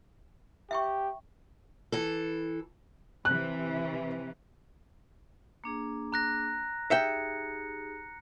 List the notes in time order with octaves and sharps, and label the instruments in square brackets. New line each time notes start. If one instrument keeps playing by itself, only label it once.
[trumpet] G4 [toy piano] E5 G5 C#6
[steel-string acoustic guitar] E3 A4
[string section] C3 E3 [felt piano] F#6
[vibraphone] A#3 D4 G#4
[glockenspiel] A#5 F#6 A#6
[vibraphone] D#4 G4 G#4 [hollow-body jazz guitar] E5 G5 [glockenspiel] C#7